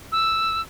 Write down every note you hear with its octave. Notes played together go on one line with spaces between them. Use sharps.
E6